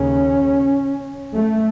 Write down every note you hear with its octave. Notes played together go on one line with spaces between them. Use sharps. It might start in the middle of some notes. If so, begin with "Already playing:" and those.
Already playing: D#2 C#3 C#4
A3